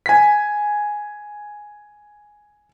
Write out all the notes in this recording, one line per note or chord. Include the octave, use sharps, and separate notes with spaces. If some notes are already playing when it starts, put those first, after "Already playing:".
G#5 B6